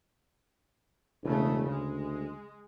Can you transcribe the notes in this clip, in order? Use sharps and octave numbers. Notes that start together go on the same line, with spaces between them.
E1 C#3 A3
D2 G#3